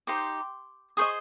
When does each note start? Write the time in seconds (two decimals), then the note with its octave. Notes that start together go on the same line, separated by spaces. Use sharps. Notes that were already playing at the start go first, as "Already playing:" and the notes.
0.07 D#4 G4 C5 C6 D6
0.97 G#4 C5 D#5 C#6 D#6